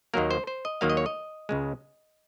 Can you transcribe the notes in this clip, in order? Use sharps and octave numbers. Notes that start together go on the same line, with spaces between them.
D#2 D#3 F#3 A#3 A#4
C5
C5
D#5
D#2 D#3 F#3 A#3 F5
D#5
C#5
D#5
C#2 C#3 G#3